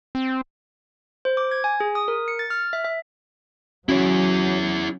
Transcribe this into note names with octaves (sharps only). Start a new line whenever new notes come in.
C4
C5
D6
G#6
G#5
G#4
D#6
A#4
C#7
A6
F6
E5
E5
F#3 C#4 E4 F#4 G#4 C#5